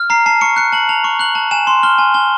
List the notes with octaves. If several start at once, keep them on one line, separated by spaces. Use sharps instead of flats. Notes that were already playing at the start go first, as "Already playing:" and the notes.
Already playing: F6
A#5 C7
A5 C7
C#6 C#7
F#6 C#7
A5 F#7
A5 F7
C#6
F#6 F#7
A5
G#5 E7
C6
F6 G7
G#5
G#5 G7